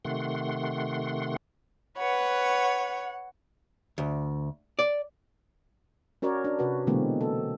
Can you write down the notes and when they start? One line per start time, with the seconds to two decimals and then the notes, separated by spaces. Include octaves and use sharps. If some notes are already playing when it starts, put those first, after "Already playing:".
0.05 C3 D#3 A3 F#5 C6
1.98 B4 C#5 F#5
3.98 D2
4.79 D5
6.22 C#4 F#4 A#4 C#5 D5
6.44 D4
6.59 C3 F#4 B4
6.87 B2 D3 E3 G#3 A#3 C4
7.21 A4